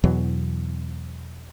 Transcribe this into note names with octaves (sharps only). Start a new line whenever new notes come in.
E2 B2 E3 F#3